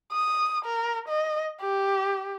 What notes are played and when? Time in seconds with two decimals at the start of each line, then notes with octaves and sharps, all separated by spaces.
0.13 D#6
0.65 A#4
1.08 D#5
1.62 G4